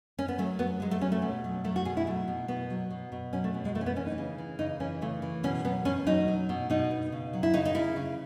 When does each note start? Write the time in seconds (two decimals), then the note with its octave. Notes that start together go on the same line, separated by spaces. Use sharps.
0.19 C#4
0.28 B3
0.38 F#3 A3
0.59 F#3 B3
0.80 F#3 G#3
0.91 A3
1.01 F#3 C#4
1.12 A3
1.22 B2
1.44 F#3
1.64 F#3 A3
1.76 F#4
1.85 B2 G#4
1.97 E4
2.07 F#3 A3
2.28 B2
2.48 B2 B3
2.70 F#3
2.91 B2
3.12 B2
3.33 F#3 C#4
3.44 A3
3.54 B2
3.65 G#3
3.75 E3 A3
3.81 C#4
3.86 B3
3.96 E3 C#4
4.06 D#4
4.18 C#3
4.38 E3
4.59 C#3 D#4
4.80 E3 C#4
5.01 C#3 A3
5.22 E3
5.43 B2 C#4
5.64 F#3 B3
5.85 B2 C#4
6.06 F#3 D#4
6.28 F#3
6.49 B2
6.70 B2 D#4
6.91 B2
7.12 C#3
7.33 F#3
7.43 E4
7.54 C#3 D#4
7.65 D#4
7.75 C#3 E4
7.96 C#3